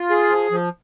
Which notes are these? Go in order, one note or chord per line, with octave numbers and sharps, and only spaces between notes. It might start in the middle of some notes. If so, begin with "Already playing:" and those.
Already playing: F4
G#4
F3
F3